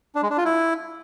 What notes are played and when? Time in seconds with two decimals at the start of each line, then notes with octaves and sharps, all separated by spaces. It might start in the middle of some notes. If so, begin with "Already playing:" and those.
0.15 D4
0.23 G#3
0.30 D4
0.38 F4
0.45 E4